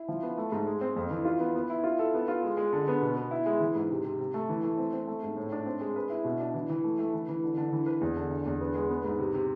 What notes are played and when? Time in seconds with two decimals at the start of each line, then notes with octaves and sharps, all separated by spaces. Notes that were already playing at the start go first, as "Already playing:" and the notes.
Already playing: E4
0.08 F3
0.22 B3
0.37 A3
0.52 G#2
0.67 G#3
0.81 C4
0.96 F2
1.10 E3
1.25 F4
1.40 B3
1.55 B3
1.70 E4
1.84 F4
1.99 A4
2.14 B3
2.28 F4
2.43 G#3
2.57 G#3
2.73 D3
2.88 B3
3.02 B2
3.16 B3
3.31 E4
3.46 G#3
3.60 E3
3.75 G#2
3.91 C3
4.04 C3
4.19 C3
4.34 A3
4.49 E3
4.63 A3
4.78 C4
4.93 C4
5.07 A3
5.23 G#2
5.37 A2
5.52 D4
5.66 C4
5.81 G#3
5.96 B4
6.10 E4
6.24 B2
6.40 D4
6.54 E3
6.70 E3
6.84 A3
6.99 A3
7.13 E3
7.29 E3
7.43 D3
7.57 D3
7.73 E3
7.86 B4
8.01 E2
8.16 D3
8.31 D3
8.46 E2
8.61 B3
8.74 G#3
8.90 B3
9.04 G#2
9.18 C3
9.34 C3